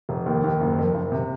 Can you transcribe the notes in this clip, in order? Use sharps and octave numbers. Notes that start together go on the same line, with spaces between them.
F1
D#2
D#2
F#1
F2
F#1
C3